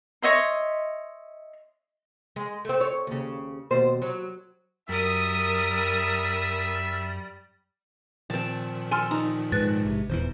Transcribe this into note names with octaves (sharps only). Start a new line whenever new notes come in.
C#5 D#5 E5 C6
G#3
A3 C4
C#5
D#2 C#3
D#2 B2 C5
F#3
F#2 G3 A#4 E5 D#6
A#2 D#3 F3 C4 A5
A4 G#5 C6 F6
D#4
G#2 B4 F#6 A6
A#1 C3
D#1 E2 E3 C5